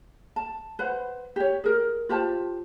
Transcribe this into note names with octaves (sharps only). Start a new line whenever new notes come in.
A5
B4 C5 F#5
G4 C#5
G#4 A#4
F4 G4 C5 A5